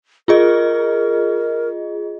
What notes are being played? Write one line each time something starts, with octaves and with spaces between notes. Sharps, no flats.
F4 G#4 A#4 D#5